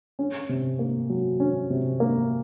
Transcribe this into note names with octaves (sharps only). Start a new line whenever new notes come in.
C#4
C3
A#3
F#3
C#4
C3
A#3